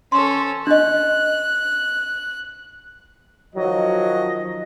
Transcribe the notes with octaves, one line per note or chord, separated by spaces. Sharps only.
C#4 A4 C6
D4 D#5 F#6
D#3 F3 F#3 D#5